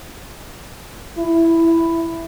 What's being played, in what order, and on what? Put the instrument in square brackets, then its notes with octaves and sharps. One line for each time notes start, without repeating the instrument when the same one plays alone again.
[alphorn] E4